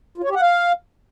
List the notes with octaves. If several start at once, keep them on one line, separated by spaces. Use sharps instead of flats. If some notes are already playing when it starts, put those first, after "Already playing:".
F4
C#5
G4
F#5
F5